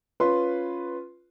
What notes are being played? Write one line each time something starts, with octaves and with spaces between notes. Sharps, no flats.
C#4 F4 B4 C6